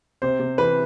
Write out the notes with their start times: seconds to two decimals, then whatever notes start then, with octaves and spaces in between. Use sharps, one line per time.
0.22 C3 C5
0.40 C3
0.58 E3 B4